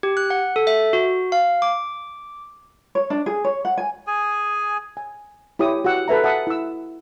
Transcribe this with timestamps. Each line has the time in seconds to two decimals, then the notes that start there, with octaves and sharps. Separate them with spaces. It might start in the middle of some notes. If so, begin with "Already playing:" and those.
0.03 G4
0.17 F#6
0.30 F#5
0.56 A4
0.67 E5
0.93 F#4
1.32 F5
1.62 D6
2.95 C#5
3.10 D4
3.26 G#4
3.44 C#5
3.65 F#5
3.78 G#5
4.07 G#4 G#5
4.97 G#5
5.59 E4 G4 C#5 D#6
5.84 F#4 G4 F#5 E6
6.08 A4 B4 E5 A#5
6.24 E5 F#5 A5 D#6
6.47 E4 E6